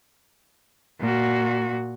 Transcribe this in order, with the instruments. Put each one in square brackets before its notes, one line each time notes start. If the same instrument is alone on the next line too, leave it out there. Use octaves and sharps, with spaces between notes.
[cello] A#2 F#4